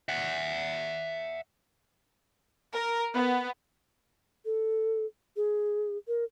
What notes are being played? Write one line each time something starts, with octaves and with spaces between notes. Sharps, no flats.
E5 F#5
A#4
B3
A4
G#4
A#4